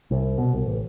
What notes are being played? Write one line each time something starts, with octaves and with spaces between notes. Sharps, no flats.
C2
B2
C2
A1